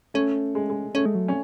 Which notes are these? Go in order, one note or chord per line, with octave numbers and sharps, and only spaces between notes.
A3 C#4
G#3
G#3
A3 C#4
G#3
F#3
C#4